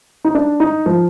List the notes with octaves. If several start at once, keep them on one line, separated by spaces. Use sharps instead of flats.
D#4
D4
D#4
F3